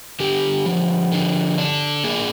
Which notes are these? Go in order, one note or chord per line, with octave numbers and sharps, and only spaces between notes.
D3 G4
F3
D3
D4
A#3 G#4